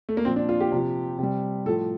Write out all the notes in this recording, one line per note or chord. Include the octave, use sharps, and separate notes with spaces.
A3
A#3
A#2 F3 C4
D4
F4
G4
C3 F3
C3 G3
A2 F3 A4